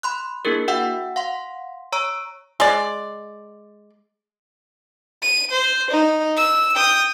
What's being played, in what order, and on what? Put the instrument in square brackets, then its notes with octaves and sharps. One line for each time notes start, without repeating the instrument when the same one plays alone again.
[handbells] B5 C6 F#6
A#3 D4 E4 G#4 A#4
F#4 E5 F#5 G5 E6
F5 F#5 C6
C#5 A#5 C#6 E6 D7
[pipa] G#3 D5
[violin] D#7
C5
D#4
E6
G5 D#6